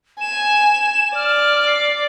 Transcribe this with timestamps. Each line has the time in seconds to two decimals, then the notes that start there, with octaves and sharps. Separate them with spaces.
0.21 G#5 E7
1.15 D5 F6
1.67 C7